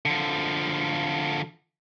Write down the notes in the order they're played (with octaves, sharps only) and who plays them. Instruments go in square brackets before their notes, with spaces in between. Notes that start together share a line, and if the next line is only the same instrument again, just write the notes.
[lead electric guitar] D3 F3